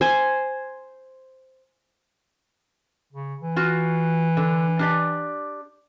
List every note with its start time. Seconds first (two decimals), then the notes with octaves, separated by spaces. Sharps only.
0.01 C5 G#5
3.12 C#3
3.41 E3
3.56 F4 F#4
4.37 D3
4.79 D4 G4 D5